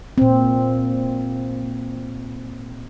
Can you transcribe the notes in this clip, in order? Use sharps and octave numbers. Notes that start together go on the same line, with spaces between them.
A#2 C4